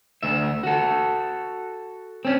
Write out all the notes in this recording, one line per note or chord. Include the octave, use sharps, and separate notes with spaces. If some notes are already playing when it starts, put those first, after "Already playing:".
D2 E5
F#4 A4
C4 C#4